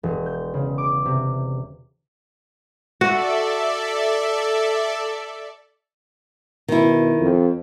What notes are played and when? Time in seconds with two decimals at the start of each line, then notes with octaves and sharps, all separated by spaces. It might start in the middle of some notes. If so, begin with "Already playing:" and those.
0.03 E1
0.26 G6
0.54 C#3
0.78 D6
1.06 C3
3.01 F#4 A4 D5 E5
6.68 B2 D#3 E4
7.20 F2